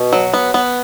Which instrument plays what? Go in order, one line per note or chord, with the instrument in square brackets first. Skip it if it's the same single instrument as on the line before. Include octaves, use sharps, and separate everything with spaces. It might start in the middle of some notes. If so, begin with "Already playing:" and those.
Already playing: [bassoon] B2
[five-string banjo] F#3
B3
B3